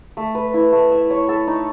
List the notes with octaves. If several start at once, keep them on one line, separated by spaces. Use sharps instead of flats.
A3
B4
E4
A3
E5
C#5
A4
D#4